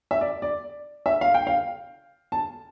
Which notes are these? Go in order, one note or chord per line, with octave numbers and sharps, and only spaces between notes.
E5
D5
D5
E5
F5
G5
F5
A5